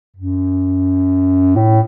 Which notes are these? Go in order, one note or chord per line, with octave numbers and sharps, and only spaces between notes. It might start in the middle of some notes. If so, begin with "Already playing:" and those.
F#2
A2